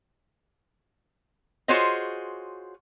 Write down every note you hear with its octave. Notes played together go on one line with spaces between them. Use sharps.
F4 F#4 G#4 C5 C#5 D#5